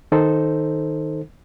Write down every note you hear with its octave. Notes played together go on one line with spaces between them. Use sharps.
D#3 D#4 A4 C5